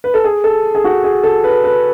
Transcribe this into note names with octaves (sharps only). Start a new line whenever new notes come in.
B4
A4
G#4
A4
G#4
F#4
G#4
A4
B4
B4